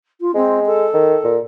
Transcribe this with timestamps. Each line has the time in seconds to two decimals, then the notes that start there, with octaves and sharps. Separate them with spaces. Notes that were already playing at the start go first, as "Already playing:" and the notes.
0.20 F4
0.35 G#3 C4
0.66 A4
0.94 D#3
1.24 A#2